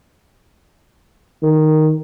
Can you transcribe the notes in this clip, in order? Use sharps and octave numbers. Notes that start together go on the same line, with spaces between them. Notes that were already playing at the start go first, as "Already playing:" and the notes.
D#3